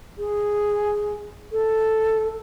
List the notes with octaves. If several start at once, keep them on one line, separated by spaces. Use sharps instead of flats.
G#4
A4